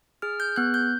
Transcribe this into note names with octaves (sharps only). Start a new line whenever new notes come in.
G#4 F6
G6
B3 F#6
G6